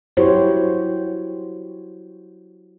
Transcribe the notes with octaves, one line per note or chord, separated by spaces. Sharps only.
F#3 E4 F#4 G4 C5 C#5